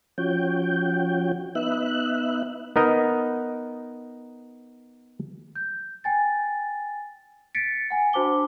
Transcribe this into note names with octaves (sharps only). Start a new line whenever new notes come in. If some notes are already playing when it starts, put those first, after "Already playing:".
F3 C#4 F#4 G5
B3 D#4 E5 F#6
B3 D#4 A#4 D#5
G6
G5 G#5 A6
A6 B6 C#7 D7
F#5 G#5
D4 F#4 C5 A5 D6 G7